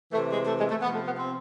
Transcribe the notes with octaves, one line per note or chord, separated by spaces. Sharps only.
C3 E3 A3
G#3
A3
G#3
A3
C3 F3 B3
A3
B3
C4